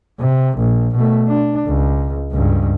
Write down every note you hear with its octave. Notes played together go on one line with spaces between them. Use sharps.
C3
A#1
B2 A3
D4
C#2
C#2 G2